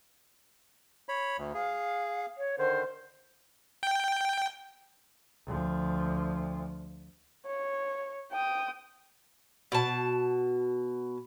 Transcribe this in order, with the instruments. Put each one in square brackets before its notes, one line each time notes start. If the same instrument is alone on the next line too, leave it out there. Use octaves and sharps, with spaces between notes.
[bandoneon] C#5 B5
D2
[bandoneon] G#4 [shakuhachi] F5
[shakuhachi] C#5
[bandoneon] D3 D#3 [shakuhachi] C5
[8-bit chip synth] G5
[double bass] D2 F3
[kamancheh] C#5
G5 D#6
[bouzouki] B2 A5